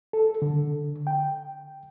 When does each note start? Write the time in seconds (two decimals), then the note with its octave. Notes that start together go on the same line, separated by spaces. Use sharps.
0.13 A4
0.42 D3
1.07 G5